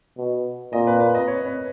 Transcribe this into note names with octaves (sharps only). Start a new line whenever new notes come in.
B2
A#2 D#5
B4
B4
D#5
C#5
B4